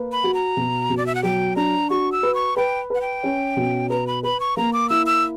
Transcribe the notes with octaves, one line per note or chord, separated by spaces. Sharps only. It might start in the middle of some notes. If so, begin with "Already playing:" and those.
Already playing: A#3 B4
B5
F#4
A#5
B2
B2
D5
E5
F#5
F#3 G5
D4 A#5
F#4 C#6
E6
B4
C#6
B4 G5
B4 F#5
G5
C#4
B2
B4 A#5
B5
B4 B5
C#6
A#3 A#5
D6
E4 E6
E6